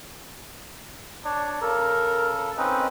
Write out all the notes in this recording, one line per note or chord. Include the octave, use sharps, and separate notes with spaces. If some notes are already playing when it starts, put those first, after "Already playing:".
D4 C#5
C#3 A4 A#4
C4 C#4 D#4 B4